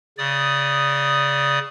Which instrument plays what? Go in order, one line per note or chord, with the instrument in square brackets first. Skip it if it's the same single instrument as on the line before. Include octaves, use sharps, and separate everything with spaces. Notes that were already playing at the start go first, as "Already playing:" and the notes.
[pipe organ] C#3 D5 D#6